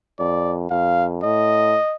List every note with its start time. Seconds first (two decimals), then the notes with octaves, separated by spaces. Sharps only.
0.19 F2 D5
0.71 F2 F5
1.23 A2 D#5